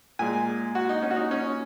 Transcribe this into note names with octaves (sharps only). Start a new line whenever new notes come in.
A#2 G#3 G#5
F#4
D#4
C#4
F#4
D#4
C#4